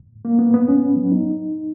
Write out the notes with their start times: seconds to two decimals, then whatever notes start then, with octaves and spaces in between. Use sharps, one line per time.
0.25 A#3
0.39 B3
0.54 B3
0.68 C#4
0.96 F#3
1.12 D#4